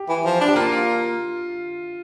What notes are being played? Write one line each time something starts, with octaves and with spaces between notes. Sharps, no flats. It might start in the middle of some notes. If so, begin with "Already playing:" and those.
Already playing: G4
E3
F3
D4
G4
A#3 F4
F4